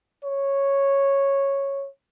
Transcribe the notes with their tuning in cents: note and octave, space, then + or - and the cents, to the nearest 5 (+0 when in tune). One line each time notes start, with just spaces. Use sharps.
C#5 -5